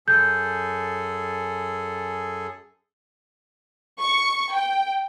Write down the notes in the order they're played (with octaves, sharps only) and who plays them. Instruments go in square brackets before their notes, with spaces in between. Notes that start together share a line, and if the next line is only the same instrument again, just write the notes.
[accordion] F#2 G#4 A4 [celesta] G6
[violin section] C#6
G5